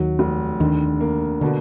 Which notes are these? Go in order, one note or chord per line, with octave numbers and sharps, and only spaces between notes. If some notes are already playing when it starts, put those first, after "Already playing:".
Already playing: D#2 D#3 F#3
F1
D#2 D3 D#3
A#3
B2 D3